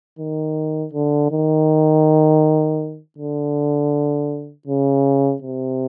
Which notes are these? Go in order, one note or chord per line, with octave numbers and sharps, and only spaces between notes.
D#3
D3
D#3
D3
C#3
C3